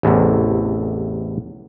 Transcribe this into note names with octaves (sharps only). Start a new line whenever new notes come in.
A1 E2 A2 C3